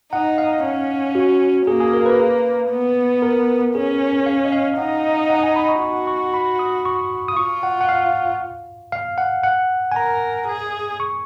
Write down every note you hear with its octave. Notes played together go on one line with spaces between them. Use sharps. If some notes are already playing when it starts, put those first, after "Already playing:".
D#4 F#5
F5
C#4
F#4
A#3 G#4
G#4
A#4
B4
B3
A#4
C#4 G#4
F5
D#5
F5
D#4 F#5
F#5
G#5
B5
C#6
F#4 C#6
C#6
B5
D#6
C#6
D#6
F4 C#6
F#5
F#5
F5
F5
F#5
F#5
G#5
A#4 A#5
G#4
C#6